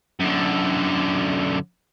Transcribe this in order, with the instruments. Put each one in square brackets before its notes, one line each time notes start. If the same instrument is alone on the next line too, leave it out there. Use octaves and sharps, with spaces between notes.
[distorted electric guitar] F#2 D3